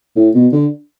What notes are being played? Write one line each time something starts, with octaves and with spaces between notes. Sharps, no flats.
A2
B2
D3